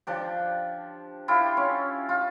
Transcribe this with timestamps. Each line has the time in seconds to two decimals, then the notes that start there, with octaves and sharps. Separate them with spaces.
0.07 F3 D4 G4
1.28 E4 F4 G4
1.57 C#4
2.09 F4